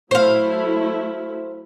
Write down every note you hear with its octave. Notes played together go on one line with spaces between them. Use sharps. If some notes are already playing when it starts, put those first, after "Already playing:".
F#3 A3 E4 C5 F5